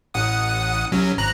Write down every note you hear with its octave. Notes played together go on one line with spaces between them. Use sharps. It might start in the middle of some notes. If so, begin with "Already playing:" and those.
A1 F#5 D#6
C2 F#3 C#4
G#1 A#5 F#6